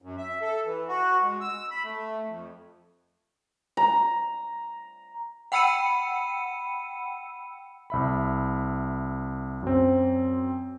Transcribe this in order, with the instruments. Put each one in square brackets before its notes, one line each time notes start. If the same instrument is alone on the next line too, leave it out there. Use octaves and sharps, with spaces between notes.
[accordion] F#2
E5
A4
E3
F#4
G#3
E6
B5
A3
F2
[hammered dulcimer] A#5
[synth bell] F#5 G5 B5 E6 C#7 D#7
[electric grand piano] C2 E5 B5
F#2 C4